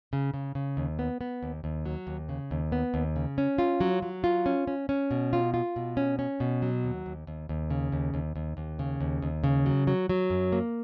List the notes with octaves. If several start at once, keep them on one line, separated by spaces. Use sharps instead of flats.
C#3
C#3
C#3
D#2
B3
B3
D#2
D#2
F#3
D#2
C#3
D#2
B3
D#2
C#3
C#4
F4
F#3
F#3
F4
C#4
C#4
C#4
B2
F4
F4
B2
C#4
C#4
B2
F#3
D#2
D#2
D#2
D#2
C#3
D#2
D#2
D#2
D#2
C#3
D#2
D#2
C#3
F#3
F#3
F#3
F#2
A#3